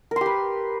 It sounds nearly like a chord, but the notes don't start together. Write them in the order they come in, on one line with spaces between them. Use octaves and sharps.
A#4 C6 G4 B4